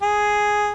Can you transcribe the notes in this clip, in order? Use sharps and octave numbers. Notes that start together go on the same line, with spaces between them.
G#4